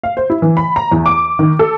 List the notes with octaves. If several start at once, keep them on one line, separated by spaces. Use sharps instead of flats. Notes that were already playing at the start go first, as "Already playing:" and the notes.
F5
C5
E4
E3
B5
A#5
E2
D6
D#3
A4